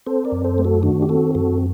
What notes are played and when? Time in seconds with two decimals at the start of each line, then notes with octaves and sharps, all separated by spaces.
0.06 C4 A4 C5
0.25 A#4 D5
0.32 F#2
0.44 A4 C5
0.58 A3
0.64 F#4 A4
0.83 D#3 D4 F#4
1.02 G4
1.09 C4 F#4 A4
1.35 F#2 F#4 A4